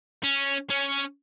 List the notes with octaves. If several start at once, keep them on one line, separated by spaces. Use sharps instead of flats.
C#4
C#4